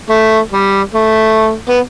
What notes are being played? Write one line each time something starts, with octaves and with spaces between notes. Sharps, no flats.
A3
G3
A3
B3